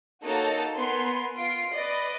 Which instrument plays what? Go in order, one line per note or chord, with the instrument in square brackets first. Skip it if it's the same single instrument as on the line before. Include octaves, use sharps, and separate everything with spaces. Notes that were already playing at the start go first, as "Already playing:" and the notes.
[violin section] A#3 D#4 F#4 A4 C#5 A5
B3 A#4 G#5 C6
F4 C7 D7
B4 D5 D#5